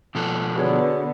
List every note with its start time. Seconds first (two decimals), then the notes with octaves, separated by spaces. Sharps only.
0.15 B2 F3 A4
0.56 D3 B3 F#4 G#4 C#5